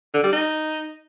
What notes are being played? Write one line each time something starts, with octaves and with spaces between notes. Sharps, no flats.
D3
G3
D#4